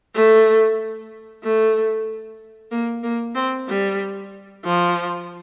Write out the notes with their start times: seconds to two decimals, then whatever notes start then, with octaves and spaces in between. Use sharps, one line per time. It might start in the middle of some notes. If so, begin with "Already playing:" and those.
0.14 A3
1.43 A3
2.71 A#3
3.03 A#3
3.35 C4
3.68 G3
4.65 F3